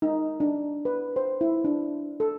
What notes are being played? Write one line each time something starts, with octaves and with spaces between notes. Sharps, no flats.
D#4
D4
B4
C5
E4
D4
A4